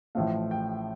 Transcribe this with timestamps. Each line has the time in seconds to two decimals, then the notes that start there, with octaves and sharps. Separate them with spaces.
0.15 A1 A2 F3 A3 F5
0.51 G5